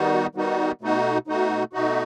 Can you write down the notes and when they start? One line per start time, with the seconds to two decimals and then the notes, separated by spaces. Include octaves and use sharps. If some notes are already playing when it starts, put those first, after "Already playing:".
Already playing: D#3 G3 B3 D#4 F#4
0.35 D#3 G3 B3 D#4 F#4
0.81 B2 A3 D#4 F#4
1.27 B2 A3 D#4 F#4
1.73 B2 A3 D#4 F#4